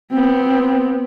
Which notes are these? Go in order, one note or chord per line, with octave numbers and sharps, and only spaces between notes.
B3 C4